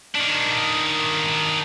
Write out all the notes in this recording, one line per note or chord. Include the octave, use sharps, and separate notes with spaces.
D#3 D4